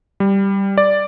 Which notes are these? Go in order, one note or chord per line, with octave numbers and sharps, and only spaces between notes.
G3
D5